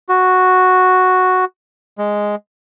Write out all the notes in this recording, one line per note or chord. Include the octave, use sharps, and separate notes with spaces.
F#4
G#3